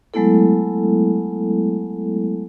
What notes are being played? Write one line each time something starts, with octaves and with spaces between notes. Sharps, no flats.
F#3 G#3 A3 B3 E4 A4